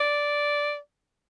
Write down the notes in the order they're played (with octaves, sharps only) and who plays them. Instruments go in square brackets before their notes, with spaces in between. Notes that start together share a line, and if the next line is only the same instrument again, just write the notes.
[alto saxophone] D5